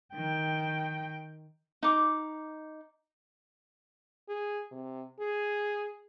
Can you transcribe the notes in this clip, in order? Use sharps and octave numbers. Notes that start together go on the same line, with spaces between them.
D#3 G5
D#4 D6
G#4
C3
G#4